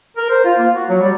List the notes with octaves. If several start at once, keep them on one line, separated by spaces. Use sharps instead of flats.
A#4
C5
F4
A#3
F#4
F#3
G3